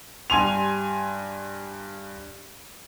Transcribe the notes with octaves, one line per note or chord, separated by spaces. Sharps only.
G2 G#5 C6 F7